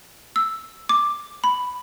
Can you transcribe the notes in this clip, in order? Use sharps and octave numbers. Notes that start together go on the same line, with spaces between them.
E6
D6
B5